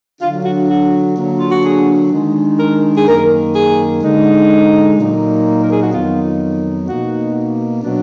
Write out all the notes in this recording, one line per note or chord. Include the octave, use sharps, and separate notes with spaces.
D3 F#3 D4 F4
F#4
F#4
D3 F#3 A#3 D4
F4
F#4
G#4
D#3 G#3 D4
A#4
G#4
F#2 D#3 A#3 A#4
G#4
D3 G#3 D#4
A#2 F#3 A#3 D#4
A#4
G#4
F#4
F2 D#3 F#3 B3 D#4 F4
B2 A#3 D#4 F#4
B2 F#3 D4